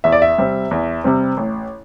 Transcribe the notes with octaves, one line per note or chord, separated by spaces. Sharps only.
E2 E5
D5
E5
C3 G3 C4
E2
C3 G3 C4
A1